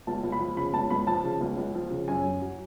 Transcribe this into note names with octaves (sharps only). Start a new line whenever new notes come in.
C#2 A5
C#2
B5
F3
C#3 B5
C#2 A5
C#2 B5
F3 A5
C#3
C#2
C#2
F3
C#3
F#2 G#5
F#2
F#3